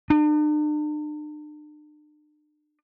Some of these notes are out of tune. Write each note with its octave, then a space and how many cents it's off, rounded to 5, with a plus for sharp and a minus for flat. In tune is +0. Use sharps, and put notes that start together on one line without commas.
D4 +45